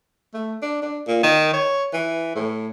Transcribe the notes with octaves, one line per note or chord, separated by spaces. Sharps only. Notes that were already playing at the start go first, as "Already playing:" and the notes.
A3
D4
D4
A#2
D#3
C#5
E3
A2